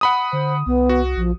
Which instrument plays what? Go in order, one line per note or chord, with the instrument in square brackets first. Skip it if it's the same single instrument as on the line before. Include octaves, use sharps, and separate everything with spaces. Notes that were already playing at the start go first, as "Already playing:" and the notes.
[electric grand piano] F#5 B5 D#6
[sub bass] D3 [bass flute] C5
[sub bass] C2 [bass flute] B3
[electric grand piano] F#4
[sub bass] A#1 [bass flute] F3